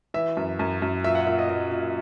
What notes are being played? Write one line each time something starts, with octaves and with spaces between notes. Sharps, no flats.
E3 E5
F#2
F#2
F#2
A#2 E5
F#5
A#2 E5
D#5
A#2 D#5
A#2